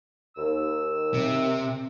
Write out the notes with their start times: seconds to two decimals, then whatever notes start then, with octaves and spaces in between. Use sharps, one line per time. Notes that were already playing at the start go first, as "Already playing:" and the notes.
0.37 D#2 E6
1.14 C3